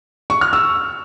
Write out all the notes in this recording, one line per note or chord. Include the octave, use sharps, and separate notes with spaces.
C#6
F6
E6